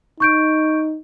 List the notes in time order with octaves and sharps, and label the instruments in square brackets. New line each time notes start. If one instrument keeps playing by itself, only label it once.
[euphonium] D#4 [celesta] C#6 G6 D7